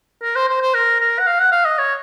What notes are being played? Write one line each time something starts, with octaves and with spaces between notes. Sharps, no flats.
A#4
C5
C5
C5
A#4
A#4
F#5
F5
F#5
F5
D#5
C#5